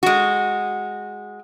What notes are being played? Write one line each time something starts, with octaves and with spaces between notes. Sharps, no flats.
G#3 F#4